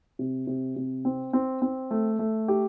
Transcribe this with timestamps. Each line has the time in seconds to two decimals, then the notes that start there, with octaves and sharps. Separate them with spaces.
0.19 C3
0.47 C3
0.76 C3
1.05 C4
1.33 C4
1.62 C4
1.91 A3
2.19 A3
2.48 G4